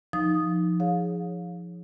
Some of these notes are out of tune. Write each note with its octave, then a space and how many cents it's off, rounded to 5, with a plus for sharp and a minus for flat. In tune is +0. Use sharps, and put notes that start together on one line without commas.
F3 +0 D#4 +0 D#6 +0
G#4 +0 C#5 +0 F5 +25